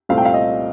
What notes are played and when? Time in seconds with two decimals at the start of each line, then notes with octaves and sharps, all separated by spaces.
0.09 C2 A#2 A3 C4 F5
0.18 G5
0.25 F5
0.34 D#5